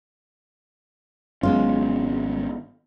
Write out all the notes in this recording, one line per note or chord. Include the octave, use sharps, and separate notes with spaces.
G#1 F#3 G#3 B3 C#4 F4